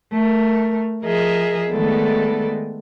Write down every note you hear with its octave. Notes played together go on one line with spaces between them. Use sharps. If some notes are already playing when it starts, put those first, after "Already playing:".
A3 A#4
F3 G#4 A#4 D#5 E5
D#3 G#3 A3 B3 A4 D5